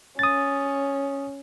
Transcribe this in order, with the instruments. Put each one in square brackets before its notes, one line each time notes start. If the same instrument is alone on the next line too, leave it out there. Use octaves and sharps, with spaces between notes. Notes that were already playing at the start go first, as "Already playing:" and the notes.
[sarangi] C#4 [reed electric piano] D#6 A6